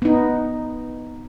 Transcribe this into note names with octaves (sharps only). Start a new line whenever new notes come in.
B3 D#4